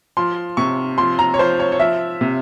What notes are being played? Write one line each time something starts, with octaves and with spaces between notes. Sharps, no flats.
F3 C6
C3 C#6
F3 C6
A#5
C#5
F3 C5
C#5
C#5
F3 E5
C3